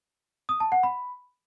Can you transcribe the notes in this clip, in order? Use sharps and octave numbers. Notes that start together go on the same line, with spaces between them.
D#6
A5
F#5
B5